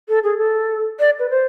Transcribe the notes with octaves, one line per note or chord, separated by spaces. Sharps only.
A4
G#4
A4
D5
B4
C5